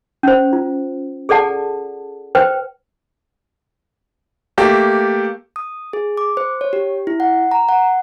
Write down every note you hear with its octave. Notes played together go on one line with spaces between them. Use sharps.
C#4 C5
F4
G#4 A4 D5 F#5 A5
B4 C5 G5
A3 A#3 G4
D#6
G#4
D6
C5
C#5
G4
E4
F#5
A#5
F#5